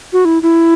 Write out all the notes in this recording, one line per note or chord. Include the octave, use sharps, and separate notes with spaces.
F#4
E4
E4